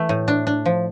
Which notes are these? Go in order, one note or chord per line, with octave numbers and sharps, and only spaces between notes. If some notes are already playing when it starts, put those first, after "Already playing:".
Already playing: E3 A3
A2
D4
D4
F3